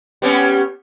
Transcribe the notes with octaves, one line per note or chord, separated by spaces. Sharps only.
G3 B3 C#4